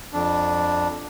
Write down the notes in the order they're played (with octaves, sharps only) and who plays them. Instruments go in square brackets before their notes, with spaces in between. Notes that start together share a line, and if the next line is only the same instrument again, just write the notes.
[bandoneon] F2 D4